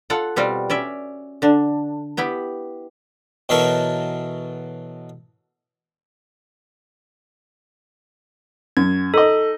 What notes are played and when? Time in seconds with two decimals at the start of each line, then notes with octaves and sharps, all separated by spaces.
0.10 F4 A4 F#5
0.36 B2 G3 C4 F4 F#4
0.70 C#4 D5 E5
1.42 D3 D4
2.17 B3 E4 G4
3.49 B2 E3 F#3 A4 A#4 C#6
8.77 F#2 G#6
9.14 D#4 A4 D#5